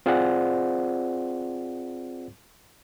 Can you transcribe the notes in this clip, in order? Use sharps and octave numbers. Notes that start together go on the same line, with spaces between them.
C4 F4 G#4 C5 D5 F#5